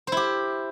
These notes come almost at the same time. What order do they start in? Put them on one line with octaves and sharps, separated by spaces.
C5 E4 G4